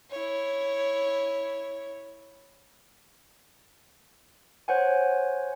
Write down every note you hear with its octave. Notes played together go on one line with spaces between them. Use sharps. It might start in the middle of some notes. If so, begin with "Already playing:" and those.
E4 C#5
C5 C#5 F#5 G#5